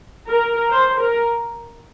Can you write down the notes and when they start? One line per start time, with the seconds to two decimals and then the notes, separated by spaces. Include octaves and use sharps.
0.29 A#4
0.70 C5
0.99 A#4